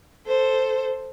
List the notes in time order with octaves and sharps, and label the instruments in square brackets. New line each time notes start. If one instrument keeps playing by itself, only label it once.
[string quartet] A4 C5